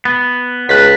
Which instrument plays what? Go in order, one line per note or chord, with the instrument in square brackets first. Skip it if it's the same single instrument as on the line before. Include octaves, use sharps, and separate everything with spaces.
[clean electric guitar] B3
[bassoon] C#2 [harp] F#6 A6 B6